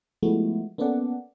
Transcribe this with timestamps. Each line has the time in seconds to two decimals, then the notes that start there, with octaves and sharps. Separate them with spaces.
0.23 F3 G#3 A3 B3 E4 F#4
0.78 A#3 B3 C#4 A4 D5 F#5